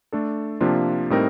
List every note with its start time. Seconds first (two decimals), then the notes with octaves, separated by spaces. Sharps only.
0.12 A3 D4 A4
0.61 C3 F3 A#3 D4 F4
1.10 A2 G3 C4 D#4 A#4